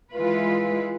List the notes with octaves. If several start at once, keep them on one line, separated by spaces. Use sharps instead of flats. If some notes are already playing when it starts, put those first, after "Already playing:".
E3 G#3 F4 B4